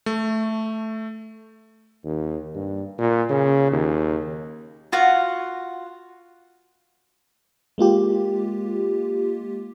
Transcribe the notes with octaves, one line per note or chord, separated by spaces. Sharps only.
A3
D#2
G2
A#2
C#3
D#2
F4 F#4 F5 F#5
G#3 A#3 F4 G4